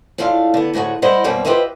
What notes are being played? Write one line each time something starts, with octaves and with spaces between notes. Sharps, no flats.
A2 G#3 D4 F4 F5
D3 B3
D2 A2 F#4 G#4 F#5
G3 E4 C5 D5 D#5 F#5
F#2 B2 G3 A#3 C4
F4 G4 B4 C5 D#5 E5